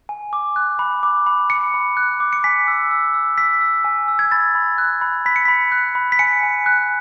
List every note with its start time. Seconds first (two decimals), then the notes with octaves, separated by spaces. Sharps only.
0.09 G#5
0.33 D6
0.56 F#6
0.79 B5
1.03 D6
1.26 B5
1.50 B5 C#7
1.74 B5
1.97 F#6
2.20 D6
2.33 C#7
2.44 G#5 B6
2.68 E6
2.91 E6
3.14 E6
3.38 E6 B6
3.61 E6
3.84 G#5
4.08 E6
4.19 G#6
4.31 B5 A6
4.55 B5
4.78 F#6
5.01 B5
5.26 B5 B6
5.36 C#7
5.45 B5 B6
5.72 F#6
5.95 B5
6.12 B6
6.19 G#5 C#7
6.43 G#5
6.66 F#6